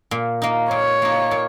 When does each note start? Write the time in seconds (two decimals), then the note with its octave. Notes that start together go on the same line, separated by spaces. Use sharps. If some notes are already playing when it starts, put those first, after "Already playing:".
0.11 A#2
0.42 A#3 D#4
0.71 A#2 C#5
1.02 A#3 D#4
1.31 A#2